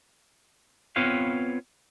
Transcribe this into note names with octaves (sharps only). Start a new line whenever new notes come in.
B3 C4 F4 B4 C#5 F5